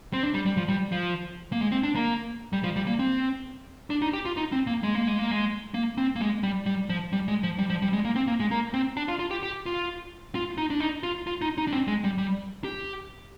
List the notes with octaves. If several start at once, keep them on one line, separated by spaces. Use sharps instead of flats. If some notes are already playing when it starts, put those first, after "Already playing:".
C4
D4
G3
G3
F3
G3
F3
A#3
G#3
C4
D4
A#3
G3
F3
G3
A#3
C4
D4
D#4
G4
F4
D#4
C4
A#3
G#3
A#3
G#3
A#3
G#3
A#3
C4
A#3
G#3
G3
G3
F3
G3
G#3
F3
G3
F3
G3
G#3
A#3
C4
A#3
G#3
A#3
C4
D4
F4
F4
G4
G4
F4
F4
D#4
D4
D#4
F4
F4
D#4
D#4
D4
C4
G#3
G3
G3
G4